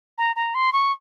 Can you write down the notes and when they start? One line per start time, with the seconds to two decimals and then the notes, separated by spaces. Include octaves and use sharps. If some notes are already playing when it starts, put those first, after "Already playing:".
0.18 A#5
0.35 A#5
0.54 C6
0.72 C#6